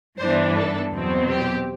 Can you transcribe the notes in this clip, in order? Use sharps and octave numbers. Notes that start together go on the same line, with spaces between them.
G2 E3 B3 D4 C5
A4
E2 B2 F#3 C4
G4